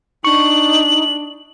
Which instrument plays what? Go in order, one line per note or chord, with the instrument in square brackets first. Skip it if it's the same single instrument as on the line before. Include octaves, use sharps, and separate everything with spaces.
[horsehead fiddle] D4 [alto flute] D#4 [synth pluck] C#6 [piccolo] F#7